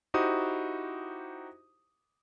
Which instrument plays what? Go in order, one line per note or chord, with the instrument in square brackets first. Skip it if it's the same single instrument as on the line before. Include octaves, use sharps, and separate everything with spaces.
[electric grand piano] D#4 E4 F#4 G4 C5 D#6